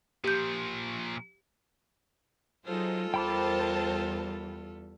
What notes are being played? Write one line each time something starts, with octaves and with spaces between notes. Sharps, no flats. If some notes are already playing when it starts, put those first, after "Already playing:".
A#2 F3 G4 G6
F#3 D#4 F4 G#4 A4 C5
E2 G3 A#4 C5 G5 A5 B5 D6